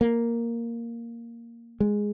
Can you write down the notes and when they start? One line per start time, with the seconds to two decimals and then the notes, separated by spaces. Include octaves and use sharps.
0.01 A#3
1.80 G#3